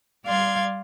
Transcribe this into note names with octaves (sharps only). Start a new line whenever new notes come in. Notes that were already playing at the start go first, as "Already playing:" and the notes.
G3 D5 F5 C6 G#6